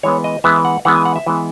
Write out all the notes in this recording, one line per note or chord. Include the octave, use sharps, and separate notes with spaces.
E3 G#3 B3 C#5
D#5
E3 G#3 B3 E5
F#5
E3 G#3 B3 F#5
G#5
F#5
E5
E3 G#3 B3